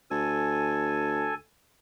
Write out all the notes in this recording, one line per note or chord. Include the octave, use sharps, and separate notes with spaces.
D2 A4 G#5